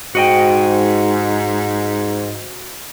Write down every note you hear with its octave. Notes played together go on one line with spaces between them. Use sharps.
G#2 F#4 D#5 G5